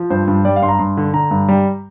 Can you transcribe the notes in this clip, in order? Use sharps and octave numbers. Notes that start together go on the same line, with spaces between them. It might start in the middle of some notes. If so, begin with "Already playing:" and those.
Already playing: F3
G2 C5
G2
G3 D5
F5
G2 C6
A#5
G2 C6
D3
D3 A#5
G2
G3